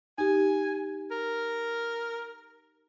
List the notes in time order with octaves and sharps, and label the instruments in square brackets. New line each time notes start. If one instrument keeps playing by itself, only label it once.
[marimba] D#4 G4 [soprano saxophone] G#5
[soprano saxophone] A#4